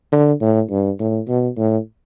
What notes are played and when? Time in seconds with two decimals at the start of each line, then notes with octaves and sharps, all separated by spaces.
0.12 D3
0.41 A2
0.71 G2
1.00 A2
1.28 B2
1.58 A2